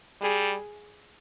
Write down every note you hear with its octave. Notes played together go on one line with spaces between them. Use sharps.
G3 G#4